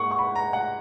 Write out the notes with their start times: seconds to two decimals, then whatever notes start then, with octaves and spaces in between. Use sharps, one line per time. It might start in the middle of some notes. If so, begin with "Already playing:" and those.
Already playing: G#2 A#3 F#5 C#6
0.11 C#6
0.19 B5
0.35 A#5
0.53 F#5